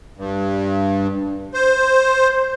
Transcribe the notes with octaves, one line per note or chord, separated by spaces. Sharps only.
G2
C5